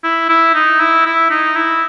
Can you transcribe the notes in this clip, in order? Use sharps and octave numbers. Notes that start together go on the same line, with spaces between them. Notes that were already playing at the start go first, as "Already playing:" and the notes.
E4
E4
D#4
E4
E4
D#4
E4